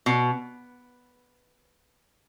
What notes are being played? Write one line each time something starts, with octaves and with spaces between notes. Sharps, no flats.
B2